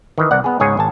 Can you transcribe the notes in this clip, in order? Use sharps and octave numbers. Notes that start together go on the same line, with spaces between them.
D#3 E3
C2 D5 F#5
B3 G#4
C#2 G#2 G#4 C#5 G#5
G#1 G#5 A5